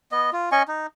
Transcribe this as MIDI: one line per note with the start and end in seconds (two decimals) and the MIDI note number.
0.12 0.30 59
0.12 0.30 75
0.33 0.50 65
0.52 0.63 61
0.52 0.63 75
0.52 0.63 80
0.52 0.63 85
0.68 0.87 63